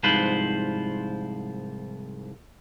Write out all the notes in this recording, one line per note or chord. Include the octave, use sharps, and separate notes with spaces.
C2 G#2 F3 F4 B4 C5